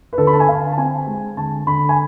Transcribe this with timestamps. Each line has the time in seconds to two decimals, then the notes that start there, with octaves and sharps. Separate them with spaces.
0.13 B4
0.18 D3 A4
0.27 B5
0.33 A5
0.40 G#5
0.48 D3 F5
0.72 A5
0.77 C4 G#5
1.06 G#3
1.37 D3 A5
1.67 D3 B5
1.89 G#5